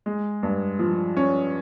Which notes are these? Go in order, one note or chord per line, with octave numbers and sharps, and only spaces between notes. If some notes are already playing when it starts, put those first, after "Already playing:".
G#3
G2
F3
C#4